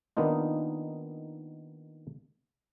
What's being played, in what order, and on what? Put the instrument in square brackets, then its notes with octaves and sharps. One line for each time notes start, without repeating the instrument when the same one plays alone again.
[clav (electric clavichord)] D#3 A#3 B3 D4 D#4 F4